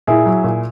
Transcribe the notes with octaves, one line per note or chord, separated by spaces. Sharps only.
A#2 E4 G#4
F#3
A#2